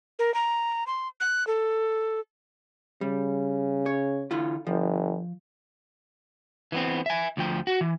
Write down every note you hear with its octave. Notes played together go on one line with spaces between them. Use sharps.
A#4
A#5
C6
F#6
A4
C#3 G3
C#5
D3 E4 F4
G1 F3
E3 B3 C4
E5 G#5
D2 F3 G5
F#4
E3